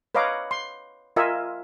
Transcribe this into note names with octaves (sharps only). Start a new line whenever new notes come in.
B4 C#5 D#5 F5 A#5 D6
C6
F4 A#4 D#5 E5 G#5